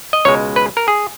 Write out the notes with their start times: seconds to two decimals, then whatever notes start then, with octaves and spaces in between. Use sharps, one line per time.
0.13 D#5
0.25 C#2 B2 G#3 C#5
0.56 B4
0.77 A#4
0.88 G#4